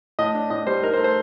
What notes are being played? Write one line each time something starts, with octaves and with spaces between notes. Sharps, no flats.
A2 D#5
D4
A2 D#5
G3 C5
D#4 A#4
C5
A3
C5